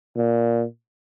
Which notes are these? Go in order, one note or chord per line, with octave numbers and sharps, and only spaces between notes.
A#2